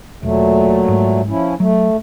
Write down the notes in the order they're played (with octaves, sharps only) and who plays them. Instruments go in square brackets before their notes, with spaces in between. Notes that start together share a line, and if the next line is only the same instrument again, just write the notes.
[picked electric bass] E1 [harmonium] A#2 F#3 A3
[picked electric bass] G#2
[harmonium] F3 C#4 E4
[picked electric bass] F#3 [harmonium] A3